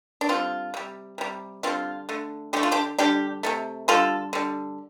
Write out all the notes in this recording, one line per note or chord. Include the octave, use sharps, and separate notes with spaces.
D4
D3 G3 C4 F4
C3 G3
C3 G3
D3 G3 C4 F4
D3 A3
D3 A3 G4
F4
D4 G4
D3 G3 D4 G4
C3 F3 A3
D3 G3 F4 A4
D3 G3